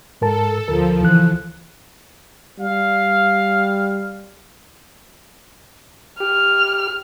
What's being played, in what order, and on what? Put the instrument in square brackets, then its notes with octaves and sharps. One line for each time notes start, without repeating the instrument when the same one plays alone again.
[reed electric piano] G#2 A#4 A5 [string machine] A4
[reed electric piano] D2 A#4 [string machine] F3
[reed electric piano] C#2 E3 F#6
[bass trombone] G3 [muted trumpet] F5
[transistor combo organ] G4 [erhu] F6